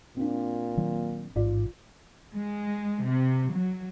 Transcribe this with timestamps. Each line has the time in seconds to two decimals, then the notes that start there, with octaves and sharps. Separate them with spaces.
0.17 A#2 C4 D4
0.77 D#3 F#3 A#3
1.36 A1 G#2 F4 D5
2.35 G#3
3.06 C3
3.54 F#3